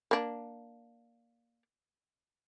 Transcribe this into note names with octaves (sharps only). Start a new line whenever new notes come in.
A#3 D4